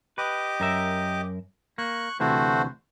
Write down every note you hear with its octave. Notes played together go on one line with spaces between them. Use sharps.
G4 B4 D#5 D6
F#2 A#4 E5
A#3 C#6 F#6
D2 C3 E3 A3 F#4 C5